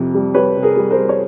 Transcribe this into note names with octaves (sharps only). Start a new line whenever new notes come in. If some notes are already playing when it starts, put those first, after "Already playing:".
Already playing: F2 C3
G3
G3 B4 C#5
C3
G#4 A#4
G3
A#4 C5
G3
C#5